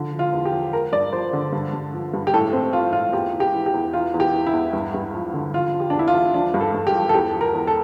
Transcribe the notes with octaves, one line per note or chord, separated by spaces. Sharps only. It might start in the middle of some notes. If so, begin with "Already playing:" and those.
Already playing: D3 F3
F3
F4
E2
G4
F3
F3 A#4
G2 D5
F3 C5
D3
G2
G2
F3
G2
G4
A2 A4
E3 C4
E3 F4
A2 F4
E2 G4
E2
G4
E3
G4
E2
E3 F4
E2
G4
E3
E4
E2
G2
G2
F3
D3
F3 F4
F3
G4
E2 D4
E4
F4
E2
F3 D4
G2
A4
G2
G4
F3
A4
E2 G4
F3
A#4
E2
A4